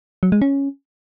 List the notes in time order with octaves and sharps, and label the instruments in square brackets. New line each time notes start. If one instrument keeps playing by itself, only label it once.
[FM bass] F#3
G#3
C#4